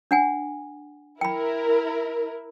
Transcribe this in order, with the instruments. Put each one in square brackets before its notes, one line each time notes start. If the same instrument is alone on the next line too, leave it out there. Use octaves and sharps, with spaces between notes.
[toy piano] D4 F#5 G#5
[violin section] E4 A#4 [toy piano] G5 B5